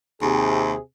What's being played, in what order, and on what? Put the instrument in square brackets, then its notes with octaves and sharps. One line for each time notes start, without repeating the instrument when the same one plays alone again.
[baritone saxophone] D#2 [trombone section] C3 G#4